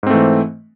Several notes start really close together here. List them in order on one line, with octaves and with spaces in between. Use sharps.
G#2 C4 A3 E3